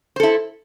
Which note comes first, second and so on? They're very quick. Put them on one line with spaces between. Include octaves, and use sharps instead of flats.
C5 A4 E4